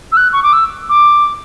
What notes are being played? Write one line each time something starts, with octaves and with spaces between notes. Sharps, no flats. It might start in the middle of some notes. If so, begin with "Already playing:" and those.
E6
F#6
C#6
D6
E6
D6